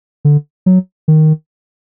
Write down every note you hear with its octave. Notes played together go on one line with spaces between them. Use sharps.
D3
F#3
D#3